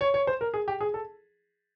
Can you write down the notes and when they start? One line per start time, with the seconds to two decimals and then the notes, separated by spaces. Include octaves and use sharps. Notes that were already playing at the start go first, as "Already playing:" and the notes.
0.01 C#5
0.14 C#5
0.27 C5
0.41 A#4
0.54 G#4
0.68 G4
0.81 G#4
0.94 A4